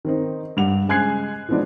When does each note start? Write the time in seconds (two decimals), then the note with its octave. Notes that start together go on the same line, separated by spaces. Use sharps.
0.05 D#3 C4 D#4
0.57 G2 G3 F#5 F7
0.88 C#3 G#3 G#5 F#6 G#6 C7
1.49 E3 F3 G#3 B3 D4 D#4